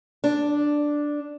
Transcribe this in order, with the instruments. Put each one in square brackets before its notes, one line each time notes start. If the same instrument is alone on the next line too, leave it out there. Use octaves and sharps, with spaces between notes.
[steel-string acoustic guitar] D4